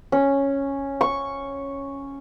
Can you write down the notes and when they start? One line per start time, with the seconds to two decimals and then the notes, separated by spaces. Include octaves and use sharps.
0.12 C#4
1.01 C#6